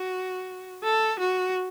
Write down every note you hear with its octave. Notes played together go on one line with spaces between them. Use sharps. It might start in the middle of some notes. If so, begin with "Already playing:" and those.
Already playing: F#4
A4
F#4